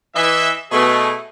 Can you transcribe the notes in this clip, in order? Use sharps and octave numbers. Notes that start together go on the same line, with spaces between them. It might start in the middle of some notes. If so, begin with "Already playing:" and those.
E3 D#5 E5
B2 A3 G#4